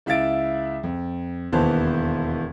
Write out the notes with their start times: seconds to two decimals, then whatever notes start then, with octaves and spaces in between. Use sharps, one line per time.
0.06 C#2 E4 E5 F5 A6 D7
0.83 F2
1.52 E1 D#2 E3 B3 C5 A5